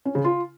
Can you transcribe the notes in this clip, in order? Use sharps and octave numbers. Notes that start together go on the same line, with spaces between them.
C#4
C#3
F4